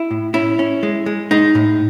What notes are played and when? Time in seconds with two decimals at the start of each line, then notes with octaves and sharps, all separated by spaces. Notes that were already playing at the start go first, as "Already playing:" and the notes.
Already playing: E4
0.11 A2
0.34 C#4 E4
0.59 C#4
0.83 G#3
1.06 G#3
1.31 G#3 D#4
1.55 A2